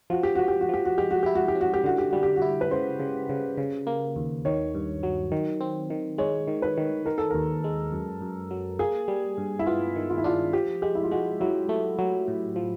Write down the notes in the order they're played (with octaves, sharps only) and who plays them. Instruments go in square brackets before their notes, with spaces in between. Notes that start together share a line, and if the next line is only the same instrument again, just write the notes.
[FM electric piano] F3 [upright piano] F#4
[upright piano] G4
[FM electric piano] F3 [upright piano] F#4
[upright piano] G4
F#4
[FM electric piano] F3 [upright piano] G4
[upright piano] F#4
[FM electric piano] G#3 [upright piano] G4
[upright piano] F#4
[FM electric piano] E4 [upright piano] G4
[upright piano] F#4
G4
[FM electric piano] C#4
[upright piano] F#4
G4
[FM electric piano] D3 [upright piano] F#4
[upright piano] G4
[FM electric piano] G3 [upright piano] F#4
[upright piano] G4
F#4
[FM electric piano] E4
[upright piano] B4
[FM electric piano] C#3 [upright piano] C5
[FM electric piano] C#3
C#3
C#3
A#3
D#2
[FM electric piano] D#3 [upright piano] C#5
[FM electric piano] G2
F#3
D#3
C4
D#3
[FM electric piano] G#3 [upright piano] C#5
[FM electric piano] D#3
[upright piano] B4
[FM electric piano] D#3
[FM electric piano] D#3 [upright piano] A#4
[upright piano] A4
[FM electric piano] D#2 [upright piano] A#4
[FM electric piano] G#3
F#2
F#2
F#3
[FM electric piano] A#3 [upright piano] G#4
[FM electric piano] G3
G2
[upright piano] E4
[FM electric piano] B3 [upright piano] F4
[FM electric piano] D#3
[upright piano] F4
E4
[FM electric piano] D4 [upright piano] F4
[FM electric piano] F3 [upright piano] G4
[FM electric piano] G#3 [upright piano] G4
[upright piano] E4
F4
[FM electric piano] G#3 [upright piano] F#4
[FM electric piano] F#3 [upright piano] E4
[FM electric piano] A3
F#3
A2
F3